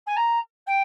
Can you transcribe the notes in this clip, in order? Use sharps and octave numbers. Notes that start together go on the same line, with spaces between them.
G#5
A#5
G5